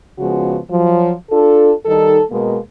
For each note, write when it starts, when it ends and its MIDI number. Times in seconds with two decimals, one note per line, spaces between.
0.18 0.57 49
0.18 0.57 53
0.18 0.57 56
0.18 0.57 59
0.18 0.57 66
0.69 1.12 53
0.69 1.12 54
1.30 1.72 62
1.30 1.72 65
1.30 1.72 69
1.85 2.18 51
1.85 2.18 55
1.85 2.18 63
1.85 2.18 69
2.30 2.57 47
2.30 2.57 56
2.30 2.57 58